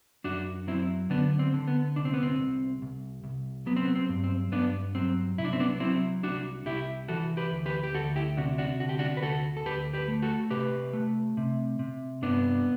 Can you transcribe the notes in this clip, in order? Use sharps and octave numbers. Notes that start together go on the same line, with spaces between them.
F#2 D4 F#4
F#3 C4 E4
D3 B3 D4
C4
D3
B3
C2 D4
C4
B3
C4
C2
C2
C2
F#3 B3
C4
B3
C4
G2
C4
G2 B3 D4
F#3 C4
C2 E4
D4
C4
B3 D4
F#3 C4 E4
C2 D4 F#4
C2 E4 G4
E3 F#4 A4
G4 B4
D2
G4 B4
G4
D2 F#4 A4
E4 G4
C3 D4 F#4
D4 F#4
D3 F#4
G4
D4 F#4
B4
D2 F#4 A4
A4
D2 G4 B4
G4 B4
A3
F#4 A4
C3 G4 B4
A3
C3
C3
G2 B3 D4